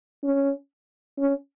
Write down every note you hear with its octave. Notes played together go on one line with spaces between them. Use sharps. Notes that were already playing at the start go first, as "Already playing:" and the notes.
C#4
C#4